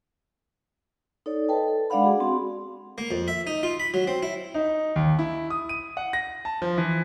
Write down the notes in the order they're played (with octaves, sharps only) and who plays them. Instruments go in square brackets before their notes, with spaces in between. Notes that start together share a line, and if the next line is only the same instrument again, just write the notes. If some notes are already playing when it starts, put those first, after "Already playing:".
[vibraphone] D#4 A4 C#5 D5
A4 B4 D#5 G5 A5
A4
G#3 D4 D5 F5 F#5 B5
F#4 G#4
C4 F#4
[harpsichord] A#3
F2
E5
D#4
F4
B5
F#3
C4
E4
[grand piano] D#4
D#2
E4
D#6
D#7
F#5
A#6
A5
F3
E3